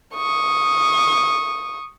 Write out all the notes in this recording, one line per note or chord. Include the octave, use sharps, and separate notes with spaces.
C#6 D#6